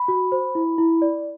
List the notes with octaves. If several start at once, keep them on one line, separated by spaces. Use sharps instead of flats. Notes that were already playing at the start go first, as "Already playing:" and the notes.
Already playing: B5
F#4
C5
E4
E4
D5